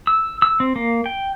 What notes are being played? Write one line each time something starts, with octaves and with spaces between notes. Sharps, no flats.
E6
E6
C4
A#3
G5